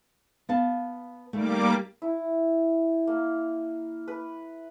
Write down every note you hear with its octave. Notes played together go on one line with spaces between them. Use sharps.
B3 F5 A5
D#2 G3 A3 A#3 D6
E4
A#3
B4